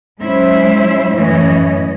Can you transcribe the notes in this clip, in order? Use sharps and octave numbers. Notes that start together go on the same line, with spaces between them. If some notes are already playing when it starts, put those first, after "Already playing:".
F#3 G#3 C#4 E4 C5 E5
F#2 A2 E3 C#4 C#5 D#5